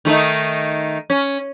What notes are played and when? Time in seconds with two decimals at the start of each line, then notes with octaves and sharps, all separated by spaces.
0.05 D#3 A3 D#4
1.10 C#4